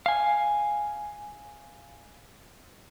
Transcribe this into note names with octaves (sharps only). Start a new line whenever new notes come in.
F5 G#5